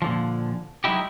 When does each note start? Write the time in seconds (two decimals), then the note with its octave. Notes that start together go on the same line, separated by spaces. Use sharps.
0.02 A#2 D3 F3
0.84 F#3 G#3 D#4 E4 G4